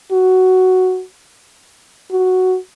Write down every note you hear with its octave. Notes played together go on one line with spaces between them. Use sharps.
F#4
F#4